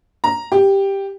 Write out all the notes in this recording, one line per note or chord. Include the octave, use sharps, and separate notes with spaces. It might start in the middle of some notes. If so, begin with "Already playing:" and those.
A#5
G4